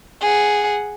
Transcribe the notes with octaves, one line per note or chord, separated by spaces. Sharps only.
G#4 F#5